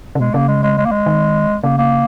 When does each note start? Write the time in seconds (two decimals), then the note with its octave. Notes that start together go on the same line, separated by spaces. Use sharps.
0.15 C#3
0.20 B2 G#3
0.34 C#3 A#3
0.48 G#3
0.63 G#3
0.78 G#3
0.86 A#3
0.92 G#3
1.06 D#3
1.63 C#3 A#3
1.78 A#3